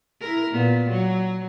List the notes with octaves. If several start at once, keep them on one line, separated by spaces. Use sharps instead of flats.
E4 A#4
A#2 B3
F#3